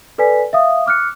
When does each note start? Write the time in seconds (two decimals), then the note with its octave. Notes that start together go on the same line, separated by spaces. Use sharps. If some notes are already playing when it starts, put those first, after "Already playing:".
0.18 A4 B4 D5 G#5 B6
0.53 E5 F5 D#6
0.86 D6 F6 F#6 C#7